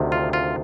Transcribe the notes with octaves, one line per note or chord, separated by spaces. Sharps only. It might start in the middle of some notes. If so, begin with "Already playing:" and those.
Already playing: D2 C3 D#3
F4
F4